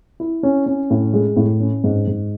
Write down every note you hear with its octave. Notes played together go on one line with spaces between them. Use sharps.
E4
C#4
C#4
A2
G#3
A2
C#4
G#2
G#2